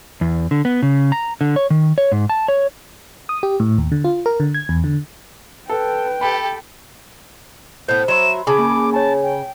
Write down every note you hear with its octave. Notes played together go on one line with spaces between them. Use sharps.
E2
D3
B3
C#3
A#5
D3
C#5
D#3
C#5
G#2
A5
C#5
D#6
G4
A2
D#2
D3
F4
A#4
D3
G#6
E2
D3
A4 B4 G5
G4 A4 B5
A2 B3 C5 G6
F#3 E5 B5 C6 E7
C#3 G#5 A5 B5 D6
A#3
C#5 G#5 A5
G5